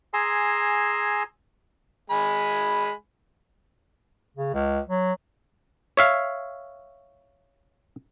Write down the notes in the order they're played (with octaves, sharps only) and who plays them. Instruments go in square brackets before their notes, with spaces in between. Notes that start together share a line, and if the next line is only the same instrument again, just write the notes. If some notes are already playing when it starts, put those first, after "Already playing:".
[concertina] G#4 G#5 A#5 C6 E6
[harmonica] G#3 G#5 B5
[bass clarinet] C#3
C#2
F#3
[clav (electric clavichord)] C#5 E5 F5